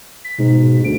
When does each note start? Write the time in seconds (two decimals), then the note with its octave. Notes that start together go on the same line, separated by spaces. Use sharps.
0.25 B6
0.39 G#2 B2
0.85 D2 D7